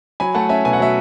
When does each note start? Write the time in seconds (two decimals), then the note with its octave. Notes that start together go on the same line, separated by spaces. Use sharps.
0.20 F#3 G#5 B5
0.35 A3 F#5 A5
0.49 C#4 E5 G#5
0.65 B2 G#5
0.73 F#5
0.79 F#3 E5